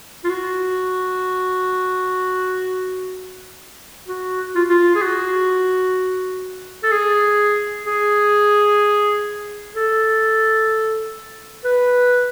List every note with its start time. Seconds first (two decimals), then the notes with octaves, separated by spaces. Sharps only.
0.24 F4
0.30 F#4
4.08 F#4
4.55 F4
4.69 F4
4.96 G#4
5.02 F#4
6.83 A4
6.91 G#4
7.86 G#4
9.75 A4
11.64 B4